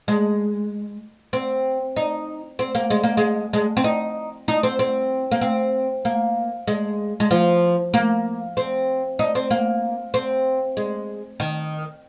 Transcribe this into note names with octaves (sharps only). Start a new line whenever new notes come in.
G#3
C4
D#4
C4
A#3
G#3
A#3
G#3
G#3
C4
D#4
D#4
C4
C4
A#3
C4
A#3
G#3
G#3
F3
A#3
C4
D#4
C4
A#3
C4
G#3
D#3